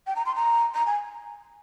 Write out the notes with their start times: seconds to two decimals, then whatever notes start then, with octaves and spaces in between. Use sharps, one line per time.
0.07 G5
0.16 A#5
0.26 C6
0.35 A#5
0.74 A#5
0.86 G#5